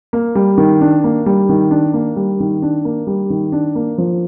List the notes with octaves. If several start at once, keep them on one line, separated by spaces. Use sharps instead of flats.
A#3
G3
D#3
D4
A#3
G3
D#3
D4
A#3
G3
D#3
D4
A#3
G3
D#3
D4
A#3
F3